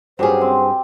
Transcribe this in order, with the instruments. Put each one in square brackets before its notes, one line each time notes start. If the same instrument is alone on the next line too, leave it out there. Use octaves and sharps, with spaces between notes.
[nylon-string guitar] G2 G#4 [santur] F#3 C#4 G4 [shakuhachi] C5
[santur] C4